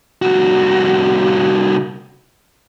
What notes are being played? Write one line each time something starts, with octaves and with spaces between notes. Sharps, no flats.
C2 F#4